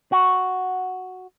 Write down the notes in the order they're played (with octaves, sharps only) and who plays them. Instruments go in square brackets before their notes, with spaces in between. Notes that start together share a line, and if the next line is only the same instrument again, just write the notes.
[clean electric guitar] F#4